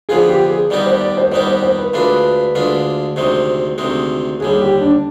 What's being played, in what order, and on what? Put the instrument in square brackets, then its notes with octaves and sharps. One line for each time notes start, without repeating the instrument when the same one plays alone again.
[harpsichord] D3 F3 B3 F4 [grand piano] G#4
[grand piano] G4
G#4
[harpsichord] D#3 G3 B3 D#4 G4 [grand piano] D5
[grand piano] C5
D5
C5
[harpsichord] D#3 G3 B3 D#4 G4 [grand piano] C5
[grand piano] C5
C5
B4
[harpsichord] D2 D3 G#3 D4 F4 [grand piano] B4
[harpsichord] D2 D3 G#3 D4 F4
D2 C3 D#3 G#3 C4
D2 C3 D#3 G#3 C4
[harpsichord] D#2 D3 G3 [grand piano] G#4
[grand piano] G4
D4